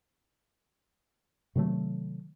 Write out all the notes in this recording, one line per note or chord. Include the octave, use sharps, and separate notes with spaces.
C3 D#3 F#3 A3